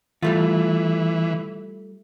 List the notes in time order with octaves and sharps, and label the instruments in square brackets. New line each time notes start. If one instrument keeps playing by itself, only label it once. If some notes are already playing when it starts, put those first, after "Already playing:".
[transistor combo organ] E3 [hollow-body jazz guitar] G3 A3 F4